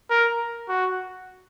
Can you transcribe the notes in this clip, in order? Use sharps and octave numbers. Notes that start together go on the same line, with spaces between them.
A#4
F#4